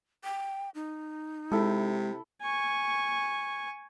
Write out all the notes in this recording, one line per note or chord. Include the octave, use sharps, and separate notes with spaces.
G5
D#4
C3 G#3 E4 A4
G#5 C#6